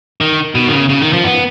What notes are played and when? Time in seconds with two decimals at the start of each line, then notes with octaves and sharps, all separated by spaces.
0.21 D#3
0.55 B2
0.68 D#3
0.72 C#3
0.89 C#3
1.01 D#3
1.13 F3
1.24 B3